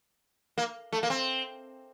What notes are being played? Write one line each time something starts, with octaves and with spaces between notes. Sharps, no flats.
A#3
A3
A#3
C4